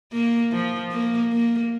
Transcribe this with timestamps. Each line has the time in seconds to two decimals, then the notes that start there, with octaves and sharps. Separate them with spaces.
0.13 A#3
0.52 F3
0.91 A#3
1.32 A#3